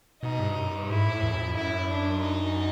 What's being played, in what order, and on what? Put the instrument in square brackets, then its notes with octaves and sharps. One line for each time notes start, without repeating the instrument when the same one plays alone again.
[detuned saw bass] B2 [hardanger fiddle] D#4
[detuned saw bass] G2
F#2
G2
[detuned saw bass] G#2 [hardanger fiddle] E4
[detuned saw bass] A2
E2
F#2
F2
[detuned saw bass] F#2 [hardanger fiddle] E4
[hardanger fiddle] D4
D#4